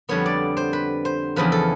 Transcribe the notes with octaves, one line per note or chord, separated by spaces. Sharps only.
F2 D3 G3 B3 C#5
D5
C5
B4
C5
E2 C#3 F3 B4
A4